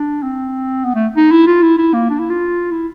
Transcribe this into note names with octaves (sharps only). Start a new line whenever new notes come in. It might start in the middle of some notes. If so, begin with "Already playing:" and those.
Already playing: D4
C4
B3
A3
D#4
E4
F4
E4
E4
A#3
D4
E4
F4
E4